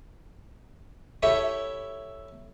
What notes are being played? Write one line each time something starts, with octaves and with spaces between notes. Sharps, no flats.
E4 G4 A4 C#5 E5